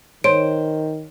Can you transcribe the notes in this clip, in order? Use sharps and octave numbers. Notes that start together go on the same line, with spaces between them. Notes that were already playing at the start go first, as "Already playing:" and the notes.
D#3 C5 C#5 D7